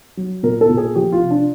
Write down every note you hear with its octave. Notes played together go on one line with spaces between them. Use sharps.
F#3
A#2 A#4
A4
A#2
G#4
F3 G4
F4
C3
D4